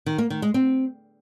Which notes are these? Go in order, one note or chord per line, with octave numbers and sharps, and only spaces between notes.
D#3
A#3
D#3
G#3
C4